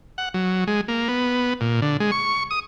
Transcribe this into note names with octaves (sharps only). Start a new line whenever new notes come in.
F#5
F#3
G#3
A#3
B3
A#2
D3
G#3
C#6
D#6